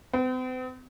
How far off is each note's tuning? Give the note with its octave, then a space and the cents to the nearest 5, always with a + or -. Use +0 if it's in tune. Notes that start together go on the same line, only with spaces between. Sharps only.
C4 -45